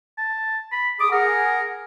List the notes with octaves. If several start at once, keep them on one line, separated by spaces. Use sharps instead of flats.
A5
B5
G#4 D6 D#6
G#4 A#4 F#5